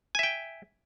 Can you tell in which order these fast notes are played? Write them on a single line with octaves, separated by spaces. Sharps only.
G#5 E5 G5